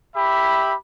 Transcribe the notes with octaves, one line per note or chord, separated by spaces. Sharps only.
G4 E5 B5